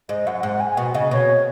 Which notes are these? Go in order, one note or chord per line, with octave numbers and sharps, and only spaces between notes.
G#2 D#5
F#2 F#5
G#2 F#5
G#5
G#5
B2 F#5
C#3 D#5
B2 C#5